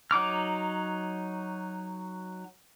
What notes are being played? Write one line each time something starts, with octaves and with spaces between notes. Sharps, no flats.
F#3 D#4 D6 F6